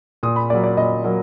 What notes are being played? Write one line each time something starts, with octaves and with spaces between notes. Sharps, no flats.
A#2 D#6
B5
F#3 A#3 D5
D5
A#2 D#5
F#3 A#3